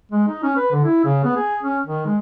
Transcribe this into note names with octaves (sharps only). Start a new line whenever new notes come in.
G#3
D#4
C#4
B4
D3
E4
C#3
B3
G#4
C#4
D#3
G#3